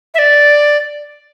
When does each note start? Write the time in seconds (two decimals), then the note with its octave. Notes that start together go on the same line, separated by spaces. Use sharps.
0.14 E5
0.19 D5